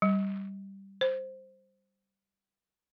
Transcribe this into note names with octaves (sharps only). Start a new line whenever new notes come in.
G3
C5